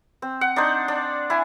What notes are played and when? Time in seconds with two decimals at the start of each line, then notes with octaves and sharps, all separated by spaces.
0.22 C4
0.41 F#5
0.56 D4 D#4 C5
0.88 D4
1.30 E4 G#5